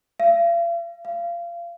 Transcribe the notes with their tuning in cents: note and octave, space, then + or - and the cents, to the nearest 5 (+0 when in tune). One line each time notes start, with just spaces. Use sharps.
F5 -45
F5 -25